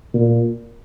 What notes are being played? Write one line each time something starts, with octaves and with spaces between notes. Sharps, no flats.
A#2